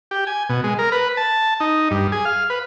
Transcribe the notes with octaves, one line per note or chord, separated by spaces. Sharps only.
G4
G#5
B2
G#3
A#4
B4
A5
D#4
G2
G#4
F5
B4